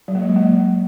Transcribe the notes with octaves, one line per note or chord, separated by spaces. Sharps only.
F#3
A#3
G#3
F#3
A#3